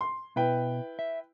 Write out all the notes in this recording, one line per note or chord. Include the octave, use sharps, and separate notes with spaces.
C6
B2 E4 B4 G5
E5